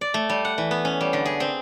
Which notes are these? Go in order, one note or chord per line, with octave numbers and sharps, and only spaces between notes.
D5
A3
G3
F#5
E3
B3
C#4
G3
D3
G#4
C4